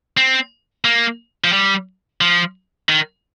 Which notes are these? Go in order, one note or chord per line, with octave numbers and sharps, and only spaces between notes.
C4
A#3
F3
G3
F3
D#3